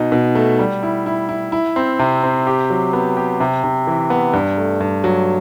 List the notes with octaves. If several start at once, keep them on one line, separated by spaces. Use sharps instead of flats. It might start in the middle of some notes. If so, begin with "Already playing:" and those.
Already playing: B2 D#4
B2
A3
G3
E4
E4
E4
E4
C4
C3
C4
G4
F#3
B3
G4
C3
C3
E3
B3
G2
A3
G2
F#3